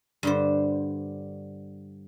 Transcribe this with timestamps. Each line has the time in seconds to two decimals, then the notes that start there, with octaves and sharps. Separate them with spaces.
0.23 G2 D3 C5